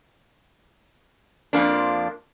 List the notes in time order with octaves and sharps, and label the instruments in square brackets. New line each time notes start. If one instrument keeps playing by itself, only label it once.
[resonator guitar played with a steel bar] F2 F3 A#3 D4